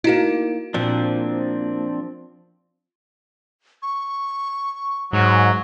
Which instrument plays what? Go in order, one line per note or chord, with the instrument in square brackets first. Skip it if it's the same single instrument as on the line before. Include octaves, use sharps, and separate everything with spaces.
[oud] A#3 D#4 [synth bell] E4 F#4
[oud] A#2 [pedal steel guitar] F3 C4 D4
[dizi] C#6
[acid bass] G#2 [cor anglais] F#3